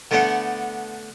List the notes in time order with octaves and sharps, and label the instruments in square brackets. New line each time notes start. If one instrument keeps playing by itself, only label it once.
[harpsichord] D3 A3 B3 D4 F#5